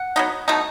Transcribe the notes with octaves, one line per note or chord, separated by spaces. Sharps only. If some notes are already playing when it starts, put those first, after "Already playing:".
Already playing: F#5
F#3 B3 D#4
B2 A3 D#4